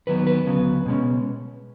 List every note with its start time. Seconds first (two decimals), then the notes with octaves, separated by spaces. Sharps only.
0.07 D#2 D#3 F#3 B3 B4
0.27 B4
0.46 D2 C#3 F#3 B3
0.86 B2 G#3 C#4